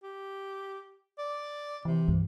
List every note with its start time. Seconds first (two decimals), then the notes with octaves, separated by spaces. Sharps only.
0.03 G4
1.18 D5
1.85 C3 E3
2.08 G2